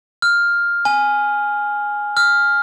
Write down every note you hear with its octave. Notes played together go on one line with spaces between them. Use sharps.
F6
G#5
F6